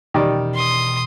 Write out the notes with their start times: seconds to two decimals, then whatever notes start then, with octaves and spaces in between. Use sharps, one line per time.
0.14 B2 D#3 E3 G3 C#4 D5
0.55 C6 D#6